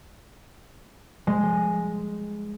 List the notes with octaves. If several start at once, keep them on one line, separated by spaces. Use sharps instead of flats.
G#3